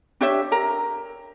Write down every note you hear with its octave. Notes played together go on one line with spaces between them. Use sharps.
D4 G4 C#5 E5
A#4 A#5